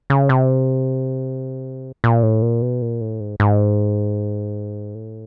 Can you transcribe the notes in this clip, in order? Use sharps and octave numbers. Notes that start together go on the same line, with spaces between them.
C#3
C3
A#2
A2
A#2
B2
A#2
A2
G#2
G#2
A2